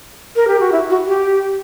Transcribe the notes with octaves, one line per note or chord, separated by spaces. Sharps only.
A#4
G4
F#4
E4
F#4
G4